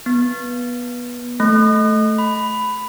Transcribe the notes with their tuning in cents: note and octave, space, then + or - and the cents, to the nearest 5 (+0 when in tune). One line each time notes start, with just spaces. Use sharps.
B3 -20
A3 -5
B5 +10